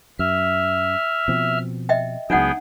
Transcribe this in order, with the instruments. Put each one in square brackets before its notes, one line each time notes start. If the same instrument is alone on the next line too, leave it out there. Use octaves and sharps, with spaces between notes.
[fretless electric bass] F#2 [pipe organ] E5 F6
[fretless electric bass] B2 F3 C4
[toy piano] D#5 E5 G5
[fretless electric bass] C#2 F#3 [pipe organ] B3 G#4 G5 [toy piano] D4 D#4 F#5